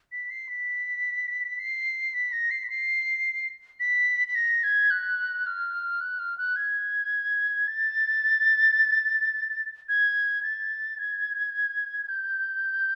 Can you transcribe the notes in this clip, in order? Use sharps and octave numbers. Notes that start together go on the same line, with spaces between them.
B6
C7
B6
C7
B6
A#6
C7
B6
C7
B6
B6
A#6
G#6
F#6
F6
F#6
F6
F#6
G#6
A6
G#6
A6
G#6
G6